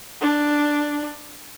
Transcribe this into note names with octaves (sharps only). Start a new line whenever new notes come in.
D4